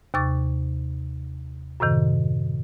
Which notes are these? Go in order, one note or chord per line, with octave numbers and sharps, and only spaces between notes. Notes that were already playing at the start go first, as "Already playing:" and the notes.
D#2 C3 C#6 D6 A6
F#2 A2 C3 D#3